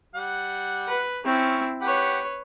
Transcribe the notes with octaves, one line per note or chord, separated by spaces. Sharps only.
G3 F#5
B4
C4 C#4 E4 C#5
G4 B4 C#5 F#5